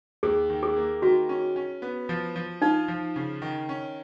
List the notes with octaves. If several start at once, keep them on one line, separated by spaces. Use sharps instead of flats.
D#2 G#4
D#3
G#4
A#3
D#3 F#4
C#4
C#4
B3
F3
F3
D#4 F4
F3
C#3
D#3
C#4